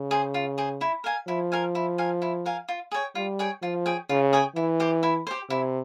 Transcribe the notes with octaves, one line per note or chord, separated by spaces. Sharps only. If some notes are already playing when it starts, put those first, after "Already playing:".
Already playing: C#3
G#4 C5
F4
G#4 C5
E4
A#4 F5 G#5
F3 E4
A#4 F5 G#5
E4
A#4 F5 G#5
E4
A#4 F5 G#5
F4
G#4 C#5 G5
G3 F4
G#4 C#5 G5
F3 F4
G#4 C#5 G5
C#3 F4
G#4 C#5 G5
E3 E4
G4 C5
E4
G4 C5
C3 E4